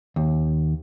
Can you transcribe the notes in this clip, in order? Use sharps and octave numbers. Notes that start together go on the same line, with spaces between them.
D#2